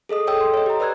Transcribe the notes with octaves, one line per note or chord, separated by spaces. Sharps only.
G#4 A4 D#5 D#6
A4 C#5 G5 D#6 E6
C6
C#5 D#5
G4 A#5
B4 D5 E6 F#6 G#6